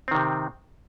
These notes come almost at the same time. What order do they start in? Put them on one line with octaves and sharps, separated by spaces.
C4 D#3 C3